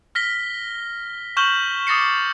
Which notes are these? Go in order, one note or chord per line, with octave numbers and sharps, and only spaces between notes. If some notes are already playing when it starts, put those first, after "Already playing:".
F6 A#6 B6 G7
C#6 F6 G6 E7 F#7 G7
D6 D#6 A6 A#6 C7 C#7